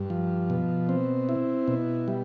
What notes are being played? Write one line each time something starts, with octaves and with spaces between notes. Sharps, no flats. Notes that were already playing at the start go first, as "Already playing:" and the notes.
Already playing: G2
F3
B2
C4
E4
B2
G3